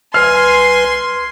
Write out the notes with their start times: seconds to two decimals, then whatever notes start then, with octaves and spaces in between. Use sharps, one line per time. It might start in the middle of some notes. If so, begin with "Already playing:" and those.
0.14 B1 B4 G#5 C6 F6 C7